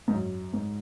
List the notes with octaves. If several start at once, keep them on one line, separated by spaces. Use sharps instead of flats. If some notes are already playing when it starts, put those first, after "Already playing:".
G#2
F#2
G#2